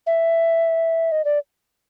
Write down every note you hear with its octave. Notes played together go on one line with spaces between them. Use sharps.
E5
D#5
D5